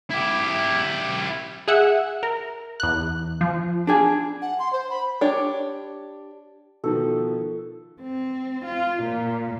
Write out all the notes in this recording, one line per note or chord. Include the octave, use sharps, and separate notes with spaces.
E4 G4
G#4 E5 F#5
A#4
E2 F#6
F3
D4 G#4 G#5
F#5
C6
C5
B5
D4 G4 C#5
B2 D#3 F3 A4
C4
F4
A#2